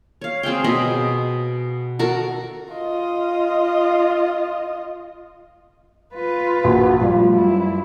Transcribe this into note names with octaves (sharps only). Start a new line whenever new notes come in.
C#5 F5
C4 G#4 F5 G5
B2 G#4 D#5 B5
F#4 A4 A#4
F4 D#5
F4 B4
A#1 F#4
F3 G3 A3 F4
F#2 E4